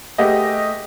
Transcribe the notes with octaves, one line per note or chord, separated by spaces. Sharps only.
A3 G4 G#4 B4 D#5 F#5